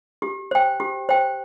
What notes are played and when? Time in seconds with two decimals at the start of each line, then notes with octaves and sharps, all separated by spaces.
0.22 G4
0.51 C5 G5
0.80 G4
1.09 C5 G5